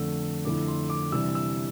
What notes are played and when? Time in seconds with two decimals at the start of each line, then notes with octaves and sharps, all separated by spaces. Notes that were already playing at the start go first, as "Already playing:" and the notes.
Already playing: F2 D3 A3 E6
0.45 F2 D3 A3 E4 D6
0.67 C6
0.90 D6
1.12 C3 E3 G3 D4 E6
1.35 E6